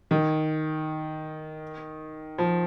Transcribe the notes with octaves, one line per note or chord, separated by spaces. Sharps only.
D#3
F3